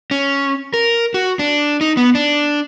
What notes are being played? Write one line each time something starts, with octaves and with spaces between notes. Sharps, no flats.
C#4
A#4
F#4
D4
D#4
B3
D4